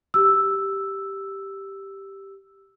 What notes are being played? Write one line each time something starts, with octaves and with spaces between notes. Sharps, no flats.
G4 E6